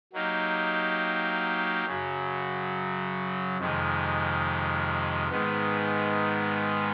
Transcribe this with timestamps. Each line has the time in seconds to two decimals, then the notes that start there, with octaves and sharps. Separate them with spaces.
0.13 F#3 A#3 D#4 G4
1.85 F#2 C#3 F#3
3.58 F2 C3 D#3 G#3
5.30 G#2 D#3 G#3 B3